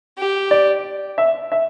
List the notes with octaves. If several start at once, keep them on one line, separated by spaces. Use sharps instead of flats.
G4
D5
E5
E5